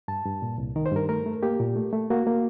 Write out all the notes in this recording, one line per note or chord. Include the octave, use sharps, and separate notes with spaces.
G2 A5
G2
A#2
C2
D#3 A#4
C5
G2 A#4
A3 A#4
A3
A#3 G4
A#2
A3
A3
A#3 F#4
A#3